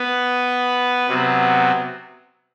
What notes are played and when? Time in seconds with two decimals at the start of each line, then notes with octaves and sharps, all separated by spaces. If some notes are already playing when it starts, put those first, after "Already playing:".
Already playing: B3 B4
1.08 C3 F#3 B3